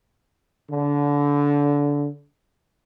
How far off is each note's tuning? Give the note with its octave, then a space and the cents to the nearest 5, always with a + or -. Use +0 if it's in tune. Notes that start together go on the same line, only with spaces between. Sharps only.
D3 -25